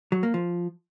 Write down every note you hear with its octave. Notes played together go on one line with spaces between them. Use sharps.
F#3
A#3
F3